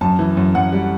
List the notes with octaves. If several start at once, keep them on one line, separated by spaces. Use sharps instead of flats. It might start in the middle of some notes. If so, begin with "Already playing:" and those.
F#2 A5
E3
F#2
F#2 F#5
G3